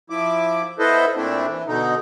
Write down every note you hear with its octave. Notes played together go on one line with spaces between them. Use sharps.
F3 E4 D6
B3 E4 A4 B4 C5 D#5
A#2 A3 C4 D4 E4
E3
B2 D3 D#4